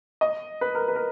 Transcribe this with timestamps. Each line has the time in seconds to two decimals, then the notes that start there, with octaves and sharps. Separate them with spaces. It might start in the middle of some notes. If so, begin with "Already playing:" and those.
0.21 D#5
0.61 B4
0.75 A#4
0.88 B4
0.96 A#4